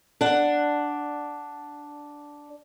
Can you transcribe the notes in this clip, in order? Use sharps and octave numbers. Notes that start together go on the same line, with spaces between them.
D4 F#5